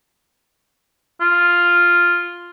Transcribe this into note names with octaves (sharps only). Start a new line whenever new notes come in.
F4